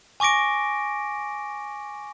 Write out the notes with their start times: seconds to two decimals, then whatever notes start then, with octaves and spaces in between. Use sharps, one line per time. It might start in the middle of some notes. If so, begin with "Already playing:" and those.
0.20 G#5 C#6 D6 A#6 D7